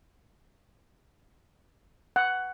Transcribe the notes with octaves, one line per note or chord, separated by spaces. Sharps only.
F#5